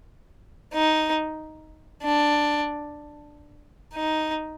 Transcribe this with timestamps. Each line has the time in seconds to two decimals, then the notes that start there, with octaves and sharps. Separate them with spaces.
0.74 D#4
2.02 D4
3.94 D#4